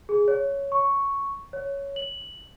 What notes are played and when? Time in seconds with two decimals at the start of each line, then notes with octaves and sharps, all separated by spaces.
0.09 G#4
0.28 C#5
0.72 C#6
1.53 C#5
1.96 F#7